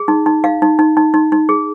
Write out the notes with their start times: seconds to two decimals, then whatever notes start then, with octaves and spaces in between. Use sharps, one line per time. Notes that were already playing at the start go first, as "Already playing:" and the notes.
Already playing: G#4
0.08 D#4
0.26 D#4
0.44 D#4 F5
0.62 D#4
0.79 D#4
0.97 D#4
1.14 D#4
1.32 D#4
1.49 G#4